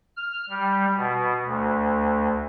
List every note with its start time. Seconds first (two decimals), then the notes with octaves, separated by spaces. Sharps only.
0.17 F6
0.50 G3
0.97 B2
1.45 D2